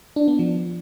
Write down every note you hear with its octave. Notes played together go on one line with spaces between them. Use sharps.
D4
B3
F3